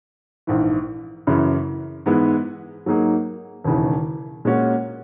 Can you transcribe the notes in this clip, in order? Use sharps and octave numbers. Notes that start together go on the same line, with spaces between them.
A#1 G#2 E3
F#2 C#3 E3
G#2 E3 G#3 B3 E4
G#2 F#3 A#3 D#4 G#4
E1 D#2 C#3 E3
A#2 G#3 C#4 F#4